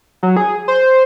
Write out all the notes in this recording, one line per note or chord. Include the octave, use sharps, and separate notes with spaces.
F#3
G#4
C5